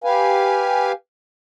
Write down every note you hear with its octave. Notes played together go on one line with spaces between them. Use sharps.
G4 B4 F5 G#5